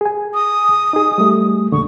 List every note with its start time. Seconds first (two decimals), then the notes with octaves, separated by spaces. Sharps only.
0.01 G#4 G#5
0.34 D#6
0.93 D#4 G#4
1.18 G3 A3
1.72 F2 A#2 D3 C#6